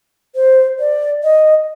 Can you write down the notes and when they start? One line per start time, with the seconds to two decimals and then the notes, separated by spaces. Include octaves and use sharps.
0.35 C5
0.79 D5
1.23 D#5